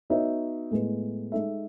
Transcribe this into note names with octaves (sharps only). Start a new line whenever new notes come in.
B3 D#4 F#4 C#5 E5
A2 G#3 B3
G#3 D#4 A4 E5